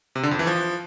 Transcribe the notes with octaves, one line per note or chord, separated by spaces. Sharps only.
C3
D3
F2
E3
F3